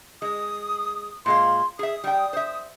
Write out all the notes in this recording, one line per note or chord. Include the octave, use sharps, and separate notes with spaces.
G#3 D#6
A#2 G#3 F5 C6
G#4 E5 D#6
G3 G5
C5 E5